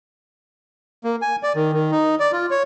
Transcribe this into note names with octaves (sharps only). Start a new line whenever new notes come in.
A#3
G#5
D5
D#3
D#3
D#4
D5
F4
C#5